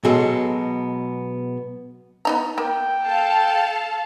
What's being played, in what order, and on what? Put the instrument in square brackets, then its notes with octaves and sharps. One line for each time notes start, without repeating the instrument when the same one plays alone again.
[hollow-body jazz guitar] B2 F#3 G#3 B3 A4
[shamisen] B3 D#4 A#5
[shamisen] A#3 [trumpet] G5
[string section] A4 F5 A5